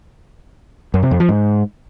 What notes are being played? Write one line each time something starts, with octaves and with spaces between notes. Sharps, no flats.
F#2
C3
F2
F3
G#2